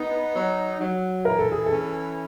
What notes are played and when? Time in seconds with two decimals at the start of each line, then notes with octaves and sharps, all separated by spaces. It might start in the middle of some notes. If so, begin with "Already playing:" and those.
Already playing: B3 D#4
0.34 F#3
0.80 F#3
1.25 E3 A#4
1.39 A4
1.52 G#4
1.66 A4
1.72 C#4